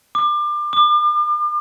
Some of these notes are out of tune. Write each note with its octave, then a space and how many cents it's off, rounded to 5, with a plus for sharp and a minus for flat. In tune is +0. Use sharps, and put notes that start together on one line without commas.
D6 +30
D6 +40